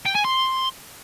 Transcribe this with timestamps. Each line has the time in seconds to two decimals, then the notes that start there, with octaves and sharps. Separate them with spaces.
0.05 G5
0.15 G#5
0.24 C6